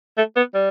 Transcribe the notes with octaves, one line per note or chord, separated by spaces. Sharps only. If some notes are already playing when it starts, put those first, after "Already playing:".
A3
B3
G3